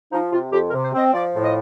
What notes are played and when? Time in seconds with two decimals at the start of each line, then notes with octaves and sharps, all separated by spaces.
0.12 F3 D#4
0.32 C3 F4
0.53 F2 G4
0.68 A#4
0.73 C3
0.83 C5
0.94 C4 D#5
1.13 F3 D5
1.34 A2
1.44 D#5